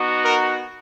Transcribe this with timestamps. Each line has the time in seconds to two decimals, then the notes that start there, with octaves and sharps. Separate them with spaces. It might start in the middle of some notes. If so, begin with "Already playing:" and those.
Already playing: B3 D#4 F#4
0.24 A#4